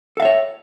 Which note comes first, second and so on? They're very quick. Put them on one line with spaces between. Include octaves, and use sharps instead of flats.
A4 F5 E5 C#5